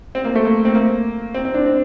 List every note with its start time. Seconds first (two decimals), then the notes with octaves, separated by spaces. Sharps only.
0.15 C4
0.24 A#3
0.35 A3
0.45 A#3
0.65 C4
0.75 A#3
1.34 C4
1.45 C4
1.54 D4
1.65 C4